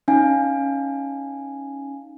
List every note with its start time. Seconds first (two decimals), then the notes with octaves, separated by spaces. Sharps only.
0.08 C#4 D#4 F5 G#5